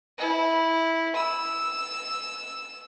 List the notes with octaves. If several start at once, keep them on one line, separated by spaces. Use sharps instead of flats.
E4
E6